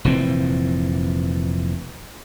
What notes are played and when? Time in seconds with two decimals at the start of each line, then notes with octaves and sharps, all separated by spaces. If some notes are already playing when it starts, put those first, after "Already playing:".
0.05 F1 A#2 E3 C4